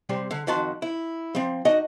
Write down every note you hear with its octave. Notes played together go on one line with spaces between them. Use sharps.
C3 G3 C4
D3
F2 D#3 F#4 A5 C6
E4
F3 C4
D4 D#4 F#4 D#5 F#5